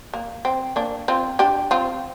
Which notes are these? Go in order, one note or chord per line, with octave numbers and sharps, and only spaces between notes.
A#3
C4
A#3 D4
C4 F4
D4 G4
C4 F4